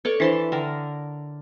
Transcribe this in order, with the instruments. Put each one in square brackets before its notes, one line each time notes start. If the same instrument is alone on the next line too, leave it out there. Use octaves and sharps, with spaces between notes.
[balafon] A4 B4 [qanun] C#5 D5 C#6
[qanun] E3 A5 C6 [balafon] D4 E4 C5
[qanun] D3 A#4 [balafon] G5